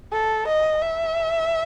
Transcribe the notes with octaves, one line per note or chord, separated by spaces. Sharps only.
A4
D#5
E5